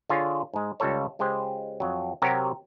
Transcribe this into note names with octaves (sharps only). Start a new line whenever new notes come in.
D3 F4 G#4 C#5
G#2 G#3
C#2 G3 F4 A4 C#5
C#2 G#3 G4 C5
F2 F#3
C3 F#3 F#4 G4 A#4